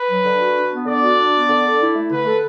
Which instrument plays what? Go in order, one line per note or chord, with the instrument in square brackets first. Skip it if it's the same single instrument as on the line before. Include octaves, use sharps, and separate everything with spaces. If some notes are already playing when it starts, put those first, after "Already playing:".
Already playing: [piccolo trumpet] B4
[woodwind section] F#3
D3
F#4
D4
B3
[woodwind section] D3 [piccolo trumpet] D5
[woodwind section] F#4
D4
B3
D3
A4
E4
A3
[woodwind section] D3 [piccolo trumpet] B4
[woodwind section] A4